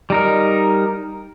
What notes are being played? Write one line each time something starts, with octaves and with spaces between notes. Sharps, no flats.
G3 D#4 A#4